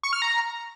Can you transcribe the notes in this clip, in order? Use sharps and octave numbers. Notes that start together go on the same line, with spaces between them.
C#6
F6
A#5